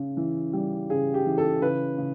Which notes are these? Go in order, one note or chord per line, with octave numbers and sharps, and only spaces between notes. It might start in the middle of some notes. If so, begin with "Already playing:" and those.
Already playing: C#3
E3
G3
C#3 G#4
G4
E3
A4
C#3 B4
C#3